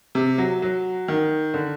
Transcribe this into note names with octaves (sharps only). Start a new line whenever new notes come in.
C3
F#3
F#3
D#3
D3